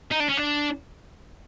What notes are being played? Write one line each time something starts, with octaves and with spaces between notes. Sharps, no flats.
D#4
D4
C#4
D4